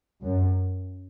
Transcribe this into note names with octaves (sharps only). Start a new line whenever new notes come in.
F#2